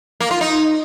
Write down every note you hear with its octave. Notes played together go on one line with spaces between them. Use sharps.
A#3
F4
D#4